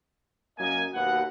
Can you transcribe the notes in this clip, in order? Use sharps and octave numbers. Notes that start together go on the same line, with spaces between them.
F#2 A#3 D#5 G#5
D#2 B2 F#5